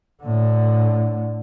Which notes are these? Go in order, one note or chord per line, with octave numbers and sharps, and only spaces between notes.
A2 D3